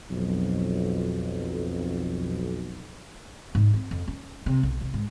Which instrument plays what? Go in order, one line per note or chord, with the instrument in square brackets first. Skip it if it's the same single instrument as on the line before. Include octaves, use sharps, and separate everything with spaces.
[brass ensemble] B1 F2
[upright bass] G#2
C4
F2
C#4
C3
B1
C3
G#2